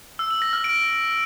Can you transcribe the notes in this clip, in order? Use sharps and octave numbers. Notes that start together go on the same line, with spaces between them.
E6
F#7
A#6
F6
D7